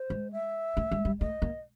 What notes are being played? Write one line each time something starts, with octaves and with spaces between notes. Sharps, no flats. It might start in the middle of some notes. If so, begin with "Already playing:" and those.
Already playing: C5
G#3
E5
A3
G#3
G3
A3 D#5
A#3